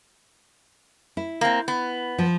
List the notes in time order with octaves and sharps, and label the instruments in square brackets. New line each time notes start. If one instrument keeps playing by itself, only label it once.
[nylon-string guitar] E4
[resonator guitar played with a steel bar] A#3 C4
B3
[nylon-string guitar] F3